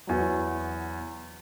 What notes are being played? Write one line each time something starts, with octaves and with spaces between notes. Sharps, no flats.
E2 F#3